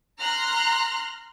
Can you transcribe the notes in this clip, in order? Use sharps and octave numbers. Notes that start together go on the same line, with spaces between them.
A#5 C6 F6 F#6